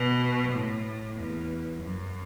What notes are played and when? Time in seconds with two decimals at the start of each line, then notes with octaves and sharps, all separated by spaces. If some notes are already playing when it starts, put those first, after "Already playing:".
Already playing: B2
0.52 A2
1.17 E2
1.82 F#2